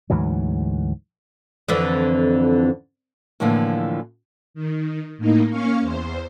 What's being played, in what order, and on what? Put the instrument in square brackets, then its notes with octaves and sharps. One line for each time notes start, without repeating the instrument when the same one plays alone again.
[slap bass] D2 G#2 E3 F#3
[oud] F2 D3 E3
[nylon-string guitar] A2 D3 E3 F3 A#3
[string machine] D#3
A2 A#3 D#4
A#3 C#4 F5 C#6
E2 C5